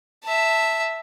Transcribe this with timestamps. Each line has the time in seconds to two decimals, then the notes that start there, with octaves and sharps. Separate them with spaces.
0.23 E5 A5